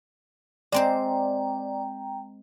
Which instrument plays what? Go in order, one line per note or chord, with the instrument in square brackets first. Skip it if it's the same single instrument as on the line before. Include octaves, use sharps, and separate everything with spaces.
[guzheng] G#3 C4 C5 [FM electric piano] D5 [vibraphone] G5 A#5